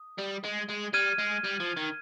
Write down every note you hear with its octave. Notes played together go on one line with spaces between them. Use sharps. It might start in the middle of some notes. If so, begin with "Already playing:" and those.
Already playing: D#6
G3
G#3
G#3
G3 F6 G#6 D#7
G#3
G3
F3
D#3